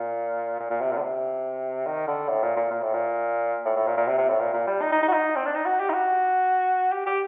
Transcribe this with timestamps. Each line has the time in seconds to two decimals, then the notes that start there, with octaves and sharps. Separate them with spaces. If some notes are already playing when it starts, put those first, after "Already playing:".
Already playing: A#2
0.60 A#2
0.70 A#2
0.81 C3
0.92 A#2
0.98 D3
1.02 C3
1.86 D#3
2.08 D3
2.29 A2
2.43 A#2
2.56 A#2
2.71 A#2
2.82 A2
2.94 A#2
3.65 A2
3.76 A2
3.87 A#2
3.97 A#2
4.08 C3
4.18 C3
4.29 A2
4.40 A#2
4.54 A#2
4.67 G3
4.82 D#4
4.92 D#4
5.03 D#4
5.08 F#4
5.13 D#4
5.36 C4
5.46 D4
5.56 D#4
5.66 F#4
5.80 G4
5.90 D#4
5.94 F#4
6.92 G4
7.06 G4